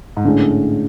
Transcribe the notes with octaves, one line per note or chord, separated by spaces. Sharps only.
G#2
A2 D3 G#3 C#4